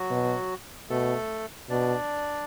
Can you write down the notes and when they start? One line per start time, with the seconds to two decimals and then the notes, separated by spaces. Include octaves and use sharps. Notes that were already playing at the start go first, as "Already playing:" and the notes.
Already playing: F#3 F#4
0.10 B2
0.90 B2 A3 A4
1.70 B2 D4 D5